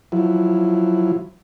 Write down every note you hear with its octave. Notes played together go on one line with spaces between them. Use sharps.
F3 F#3 E4